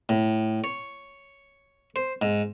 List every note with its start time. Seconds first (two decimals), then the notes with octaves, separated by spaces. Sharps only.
0.09 A2
0.64 C#5
1.96 C5
2.22 G#2